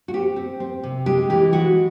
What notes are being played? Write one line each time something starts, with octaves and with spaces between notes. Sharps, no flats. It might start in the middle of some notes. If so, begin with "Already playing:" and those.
F#4
C4 G4
C4
C4
C3
G#3 G4
E3 G4
G#3 F#4